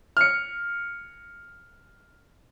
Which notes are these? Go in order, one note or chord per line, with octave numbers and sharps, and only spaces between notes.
F6 C#7